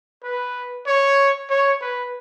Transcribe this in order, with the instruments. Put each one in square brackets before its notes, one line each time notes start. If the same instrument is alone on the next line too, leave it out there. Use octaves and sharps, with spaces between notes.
[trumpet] B4
C#5
C#5
B4